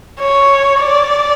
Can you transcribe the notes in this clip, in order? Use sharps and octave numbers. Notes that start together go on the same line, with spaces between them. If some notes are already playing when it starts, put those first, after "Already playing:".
C#5
D5